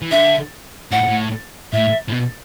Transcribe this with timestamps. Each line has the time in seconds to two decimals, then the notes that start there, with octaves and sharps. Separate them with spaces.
0.02 E3
0.11 D3 E5
0.91 A2 F#5
1.07 A2
1.73 A2 E5
2.09 A2
2.12 B2